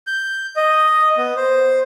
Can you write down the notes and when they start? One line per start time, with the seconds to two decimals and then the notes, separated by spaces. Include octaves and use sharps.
0.07 G6
0.56 D#5
1.18 B3
1.37 C5